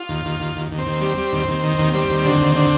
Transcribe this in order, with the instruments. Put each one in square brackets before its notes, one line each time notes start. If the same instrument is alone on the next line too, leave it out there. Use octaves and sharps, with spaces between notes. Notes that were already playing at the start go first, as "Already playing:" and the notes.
Already playing: [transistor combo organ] F4
D#2
D#2
D#2
D#2
D#2
C4
D#2
G3
G3
D#2
D#2
D#3
D#2
G3 C4
D#2
D3
D#2
D3